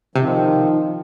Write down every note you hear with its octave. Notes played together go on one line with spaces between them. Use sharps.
C3 D#3 F3